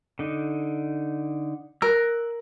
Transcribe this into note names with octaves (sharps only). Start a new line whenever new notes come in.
D3 D#4
A#4 E6 F#6